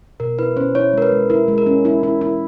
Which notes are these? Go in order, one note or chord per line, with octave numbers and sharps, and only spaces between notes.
B2 A#4
E4 B4
C#4 C5
E4 C#5
G#3 A#4
B4
G#3
E4 A#4
G#3
A#4
C#4
E4
E4
E4